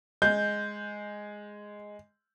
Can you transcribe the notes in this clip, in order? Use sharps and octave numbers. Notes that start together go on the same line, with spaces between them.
G#3 G6